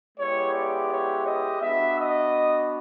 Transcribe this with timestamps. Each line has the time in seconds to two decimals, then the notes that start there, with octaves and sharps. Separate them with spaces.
0.17 G#3 B3 E4 G4 C#5
0.52 D5
0.90 C#5
1.25 D#5
1.61 B3 D4 F#4 E5
1.98 D#5